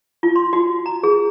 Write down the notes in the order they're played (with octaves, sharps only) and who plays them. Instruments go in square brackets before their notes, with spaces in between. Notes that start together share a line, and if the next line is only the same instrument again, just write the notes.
[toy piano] F4
C6
F#4
A#5
G#4